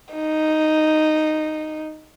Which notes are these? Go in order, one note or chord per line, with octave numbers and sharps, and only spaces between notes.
D#4